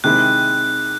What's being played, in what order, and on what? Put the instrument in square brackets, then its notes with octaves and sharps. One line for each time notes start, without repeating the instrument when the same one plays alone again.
[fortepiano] C3 D#3 G#3 C4 E4 [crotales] F#6